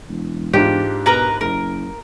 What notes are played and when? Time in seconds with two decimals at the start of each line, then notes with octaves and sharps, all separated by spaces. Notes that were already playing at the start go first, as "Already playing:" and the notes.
0.09 E1
0.53 G#2 D4 F4 G4
1.06 B2 A#4 B4 A#5
1.41 F#1 A#4